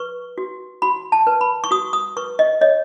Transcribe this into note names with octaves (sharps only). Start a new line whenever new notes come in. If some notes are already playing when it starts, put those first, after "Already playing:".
Already playing: B4 C#6
F#4
F#4 B5
A5
B4
B5
C#6
F#4 D#6
D#6
B4 C#6
D#5
C#5 D#5